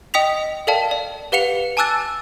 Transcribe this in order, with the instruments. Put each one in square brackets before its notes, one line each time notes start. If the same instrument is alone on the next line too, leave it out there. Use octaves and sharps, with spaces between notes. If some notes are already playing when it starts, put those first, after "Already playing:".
[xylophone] D#5 G5 D#6 B6 F7
A4 A#4 D5 F5 G5 A5
D5
G4 B4 F5 F#5 C#7 F7
G#5 A5 D6 E6 F#6 A6